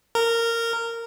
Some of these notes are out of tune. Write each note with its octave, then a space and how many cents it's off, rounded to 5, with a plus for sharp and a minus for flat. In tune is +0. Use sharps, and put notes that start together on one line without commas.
A#4 -15